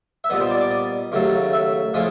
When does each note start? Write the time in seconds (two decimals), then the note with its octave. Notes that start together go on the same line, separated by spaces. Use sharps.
0.24 E5
0.30 A#2 G3 B3 D#5
0.40 C5
0.50 D5
0.61 D5
0.70 D#5
1.12 D#2 C#3 F#3 A3
1.53 E5
1.94 C#3 F3 A3 C#4 E4 D#5